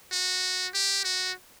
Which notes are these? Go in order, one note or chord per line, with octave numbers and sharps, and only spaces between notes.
F#4
G4
F#4